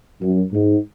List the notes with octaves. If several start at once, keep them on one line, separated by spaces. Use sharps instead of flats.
F#2
G#2